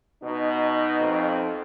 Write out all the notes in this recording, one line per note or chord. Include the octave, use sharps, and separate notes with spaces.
B2 D#4
F2